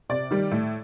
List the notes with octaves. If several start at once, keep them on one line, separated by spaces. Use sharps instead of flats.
C3 D5
D#3 G3
A2